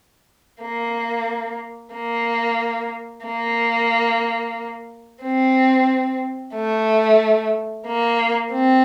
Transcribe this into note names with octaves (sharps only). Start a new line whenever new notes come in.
A#3
A#3
A#3
C4
A3
A#3
C4